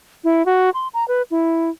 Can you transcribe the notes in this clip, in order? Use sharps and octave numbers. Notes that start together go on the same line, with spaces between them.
E4
F#4
C6
A#5
B4
E4